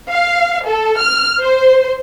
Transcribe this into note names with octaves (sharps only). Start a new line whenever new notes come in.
F5
A4
F6
C5